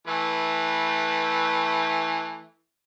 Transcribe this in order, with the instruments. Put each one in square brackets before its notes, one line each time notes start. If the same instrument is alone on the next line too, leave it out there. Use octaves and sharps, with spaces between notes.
[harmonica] E3 A3 B4